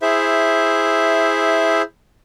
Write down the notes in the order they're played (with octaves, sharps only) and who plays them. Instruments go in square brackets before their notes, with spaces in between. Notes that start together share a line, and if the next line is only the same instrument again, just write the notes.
[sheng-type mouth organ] E4 G#4 C5 E5